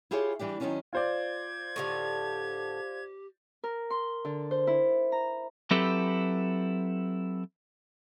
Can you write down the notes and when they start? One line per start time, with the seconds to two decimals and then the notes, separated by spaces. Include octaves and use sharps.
0.11 E4 F4 G4 G#4 C#5
0.39 E3 G3 D4 G4
0.60 D#3 F#3 A3 B3 C#4 D4
0.93 F4 C5 D5 G#6
1.76 A2 D3 G4 F5
3.64 A#4
3.90 C6
4.25 D3
4.51 C5
4.67 E4
5.12 A#5
5.71 F#3 C4 E4 G4 A4 B4